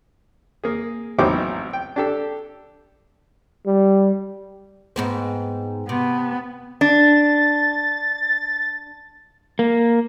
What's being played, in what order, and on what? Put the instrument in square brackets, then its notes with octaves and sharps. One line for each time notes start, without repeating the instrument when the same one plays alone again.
[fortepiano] A#3 G#4
A1 F#3 B3 C4 D#4 D6
G5
D4 G4 A4
[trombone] G3
[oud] G#2 B3 C4
[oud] C3 [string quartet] B3
[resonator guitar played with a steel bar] D4 [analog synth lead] A6
[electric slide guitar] A#3